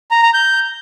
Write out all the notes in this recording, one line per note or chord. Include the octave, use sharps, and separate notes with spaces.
A#5
A#5
G6